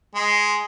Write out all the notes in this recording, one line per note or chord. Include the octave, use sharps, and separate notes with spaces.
G#3